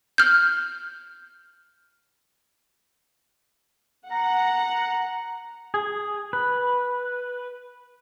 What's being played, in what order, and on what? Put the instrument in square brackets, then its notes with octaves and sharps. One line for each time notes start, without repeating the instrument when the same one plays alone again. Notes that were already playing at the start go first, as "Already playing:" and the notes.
[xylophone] F6 G6
[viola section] F#5 [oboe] A#5
[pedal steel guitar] G#4
B4